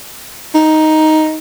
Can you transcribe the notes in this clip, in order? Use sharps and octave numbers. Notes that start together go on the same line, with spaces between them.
D#4